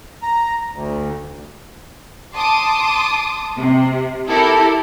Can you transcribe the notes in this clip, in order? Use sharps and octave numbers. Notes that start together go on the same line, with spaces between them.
A#5
D2
A5 C6 D6 D#6
C3
E4 G4 A4 A#4